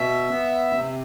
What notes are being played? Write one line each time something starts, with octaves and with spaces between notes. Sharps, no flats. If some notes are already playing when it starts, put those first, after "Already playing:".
Already playing: B2 E5
B3
C3